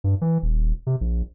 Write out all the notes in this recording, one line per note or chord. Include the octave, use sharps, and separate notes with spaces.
G2
E3
D#1
C3
A#1